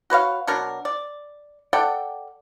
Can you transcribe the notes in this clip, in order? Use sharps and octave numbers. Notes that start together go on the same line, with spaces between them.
F#4 B4 C#5 F5
B2 F#3 D4 A#4
D5
A4 D5 F#5 G5